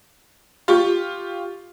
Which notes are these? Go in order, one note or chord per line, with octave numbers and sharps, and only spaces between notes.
F4 G4 C#6